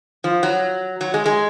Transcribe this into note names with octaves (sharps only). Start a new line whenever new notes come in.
F3
F#3
F#3
G#3
G#3